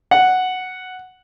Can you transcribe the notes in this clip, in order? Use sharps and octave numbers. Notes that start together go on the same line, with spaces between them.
F#5